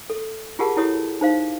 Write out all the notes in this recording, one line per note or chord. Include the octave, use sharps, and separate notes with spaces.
A4
F4 G4 G#4 A#4 F#5 A5
E4 F#4 G4 A4 C#5 D#6
D#4 C5 F5